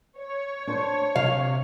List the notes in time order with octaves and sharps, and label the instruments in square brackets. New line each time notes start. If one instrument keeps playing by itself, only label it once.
[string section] C#5
[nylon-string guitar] D4 C5
[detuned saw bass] C3 [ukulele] F5